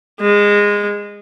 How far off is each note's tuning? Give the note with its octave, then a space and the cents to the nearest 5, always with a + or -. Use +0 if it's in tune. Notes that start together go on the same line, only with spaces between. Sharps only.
G#3 -20